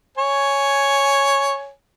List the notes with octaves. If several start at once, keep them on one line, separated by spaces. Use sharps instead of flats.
C#5 G#5